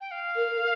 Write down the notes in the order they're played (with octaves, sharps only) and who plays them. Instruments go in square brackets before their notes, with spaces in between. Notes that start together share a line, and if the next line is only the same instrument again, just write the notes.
[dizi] G5
F5
[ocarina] A#4